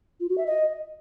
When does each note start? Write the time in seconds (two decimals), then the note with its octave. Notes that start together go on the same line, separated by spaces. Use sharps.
0.20 F4
0.29 F#4
0.38 E5
0.47 D#5